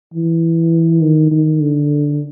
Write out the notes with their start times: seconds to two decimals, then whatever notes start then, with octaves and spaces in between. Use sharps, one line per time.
0.14 E3
1.02 D#3
1.32 D#3
1.61 D3